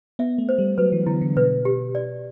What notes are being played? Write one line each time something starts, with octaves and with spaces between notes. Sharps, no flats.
B3 E5
A3
C5
G3
F#3 B4
E3
D3 E4
D3
B2 B4
G4
D5